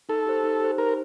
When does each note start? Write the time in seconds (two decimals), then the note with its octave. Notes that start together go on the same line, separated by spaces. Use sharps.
0.09 D#4 A4
0.26 G4 C5
0.44 D#4
0.60 G4 C5
0.78 D#4 A#4